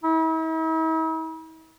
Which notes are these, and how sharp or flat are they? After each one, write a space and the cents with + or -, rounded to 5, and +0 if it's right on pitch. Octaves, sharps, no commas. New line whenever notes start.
E4 -45